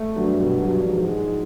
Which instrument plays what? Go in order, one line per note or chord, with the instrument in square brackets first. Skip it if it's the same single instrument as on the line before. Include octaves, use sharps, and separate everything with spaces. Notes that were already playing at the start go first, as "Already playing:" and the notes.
Already playing: [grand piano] A3
[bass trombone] G2 [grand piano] F#3
[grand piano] B2
F#3
[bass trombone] G#2 [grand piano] F3
[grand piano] G#3